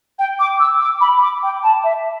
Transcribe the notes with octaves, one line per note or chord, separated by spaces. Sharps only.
G5
D6
E6
D6
B5
D6
G5
A5
E5